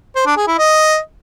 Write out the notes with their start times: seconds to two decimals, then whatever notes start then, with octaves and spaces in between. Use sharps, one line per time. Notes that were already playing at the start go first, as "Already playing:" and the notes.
0.16 C5
0.26 D4
0.37 G#4
0.47 E4
0.58 D#5